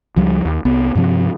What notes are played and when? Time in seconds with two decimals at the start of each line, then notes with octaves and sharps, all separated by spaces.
0.16 C#2 F3 G3
0.45 D#2
0.65 C2 B3
0.95 G2 C3 F3 C4